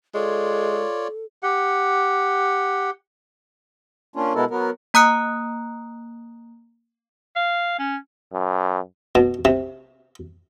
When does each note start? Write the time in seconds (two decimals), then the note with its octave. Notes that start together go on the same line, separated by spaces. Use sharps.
0.15 G#3 F4 A4 C#5 D5
1.43 G4 F#5
4.16 A#3 C#4 D4 F4
4.35 B2 G#3 B3 E4 A4 A#4
4.50 F#3 B3 A#4
4.94 A#3 A#5 D#6 F#6 C#7
7.36 F5
7.79 C#4
8.33 F#2
9.15 B2
9.45 C3